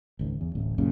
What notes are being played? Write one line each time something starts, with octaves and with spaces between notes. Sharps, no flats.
G#1 C#2
E2
D1 A1
C2 F#2 A#2 C#3